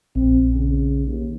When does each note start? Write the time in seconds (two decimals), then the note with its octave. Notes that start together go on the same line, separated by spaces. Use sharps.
0.16 A#1 C4
0.55 C#3
1.06 D#2